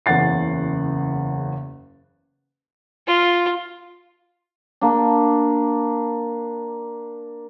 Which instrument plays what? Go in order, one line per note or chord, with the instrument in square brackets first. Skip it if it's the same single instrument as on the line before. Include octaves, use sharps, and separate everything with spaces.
[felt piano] F#1 E2 C#3 F#5 A6 C7
[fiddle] F4
[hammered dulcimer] A#3 D4